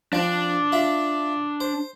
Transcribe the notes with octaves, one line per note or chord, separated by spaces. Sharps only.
F3 C4 D4
F4 E5
C5